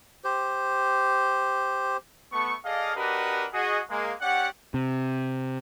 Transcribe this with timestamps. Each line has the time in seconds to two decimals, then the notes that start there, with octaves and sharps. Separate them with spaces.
0.24 G4 C5
2.33 A3 B3 C#6
2.65 G#4 A4 D5 D#5 F5
2.96 D4 F#4 G4 A#4 B4 D#5
3.54 F#4 G#4 D#5
3.90 G#3 A#3
4.21 C#4 G4 D5 F#5
4.74 C3